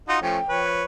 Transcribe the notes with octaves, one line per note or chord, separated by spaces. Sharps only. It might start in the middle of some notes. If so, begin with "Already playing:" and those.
D#4 F4 F#4 C6
F3 A3 C#4 G5
F3 B4 C#5